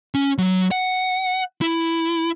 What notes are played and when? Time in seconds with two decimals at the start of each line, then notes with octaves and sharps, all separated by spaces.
0.14 C#4
0.38 F#3
0.71 F#5
1.61 E4